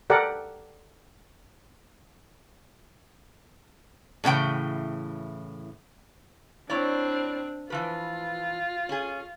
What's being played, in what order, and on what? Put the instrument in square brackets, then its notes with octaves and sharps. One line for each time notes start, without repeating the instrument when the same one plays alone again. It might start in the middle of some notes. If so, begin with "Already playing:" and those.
[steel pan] G4 A4 A#4 D5 F#5
[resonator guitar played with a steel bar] A2 C#3 E3 G5
[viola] C4 D4 [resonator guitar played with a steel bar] E4 C#5 D5
[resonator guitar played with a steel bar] E3 F3 B4 [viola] F4
[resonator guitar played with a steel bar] C#4 G#4